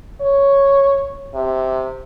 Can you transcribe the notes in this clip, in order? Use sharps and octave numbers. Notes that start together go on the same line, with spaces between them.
C#5
C3